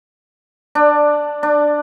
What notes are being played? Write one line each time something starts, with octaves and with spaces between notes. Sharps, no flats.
D4
D4